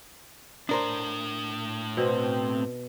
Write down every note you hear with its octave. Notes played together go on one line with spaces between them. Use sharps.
A2 D4 A#4 C5
B2 C4